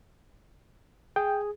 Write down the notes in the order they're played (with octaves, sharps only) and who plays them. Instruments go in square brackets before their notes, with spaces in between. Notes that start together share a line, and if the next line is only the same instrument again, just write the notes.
[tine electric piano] G#4 [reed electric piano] G5